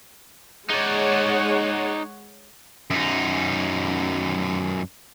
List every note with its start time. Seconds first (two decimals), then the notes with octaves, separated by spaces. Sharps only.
0.70 G#3 D#4 C#5 D5 F#5
2.91 F#2 D#4